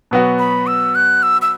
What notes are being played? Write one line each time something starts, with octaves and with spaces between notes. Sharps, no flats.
B2 F#3 B3 F#4
B5
E6
F#6
E6
E6